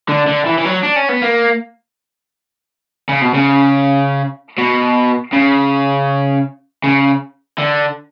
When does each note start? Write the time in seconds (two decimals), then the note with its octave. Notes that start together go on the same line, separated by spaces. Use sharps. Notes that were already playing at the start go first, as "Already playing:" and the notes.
0.09 D3
0.28 D3
0.46 E3
0.58 E3
0.65 F#3
0.83 D4
0.96 C#4
1.09 B3
1.22 A#3
3.09 C#3
3.22 B2
3.34 C#3
4.58 B2
5.33 C#3
6.84 C#3
7.59 D3